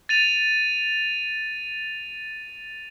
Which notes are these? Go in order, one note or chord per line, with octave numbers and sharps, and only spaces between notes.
A6 D#7 F7